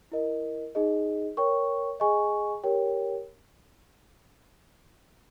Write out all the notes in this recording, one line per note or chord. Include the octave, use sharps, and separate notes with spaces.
E4 A#4 D#5
D#4 G#4 D#5
A#4 C#5 G5 C#6
G#4 D#5 G#5 C#6
G4 A#4 C#5 G5